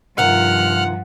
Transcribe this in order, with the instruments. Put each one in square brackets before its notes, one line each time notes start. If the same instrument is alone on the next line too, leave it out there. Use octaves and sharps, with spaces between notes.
[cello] G2 F3 [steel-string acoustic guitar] C3 D#3 F4 [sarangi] F#5 [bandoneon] F6 F#6